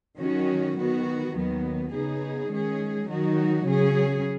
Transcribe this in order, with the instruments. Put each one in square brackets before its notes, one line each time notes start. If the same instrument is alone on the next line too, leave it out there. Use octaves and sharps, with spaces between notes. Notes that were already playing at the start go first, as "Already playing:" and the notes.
[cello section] D#3 F#3 C#4 F#4
D#3 B3 F#4
D#2 D#3 F#3 B3
C#3 B3 D#4 G#4
D#3 G#3 C#4 G#4
D#3 F#3 D#4 F#4
C#3 F#3 C#4 G#4